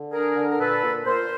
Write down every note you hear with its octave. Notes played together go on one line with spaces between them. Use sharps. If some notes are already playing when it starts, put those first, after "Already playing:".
Already playing: D3
D4 G#4 A#4
D3
A#4
A#2 A4 B4
A#2
A#2 A#4 C5